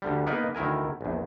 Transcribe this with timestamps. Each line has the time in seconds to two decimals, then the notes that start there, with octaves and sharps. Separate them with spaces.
0.02 D2 D3 G3
0.26 A#3 B3 D#4 A#4 B4 D#5
0.55 D2 D#3 E4 A#4 G#5
1.01 A#1 E2